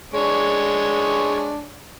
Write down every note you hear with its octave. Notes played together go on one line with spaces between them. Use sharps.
G#3 D4 C#5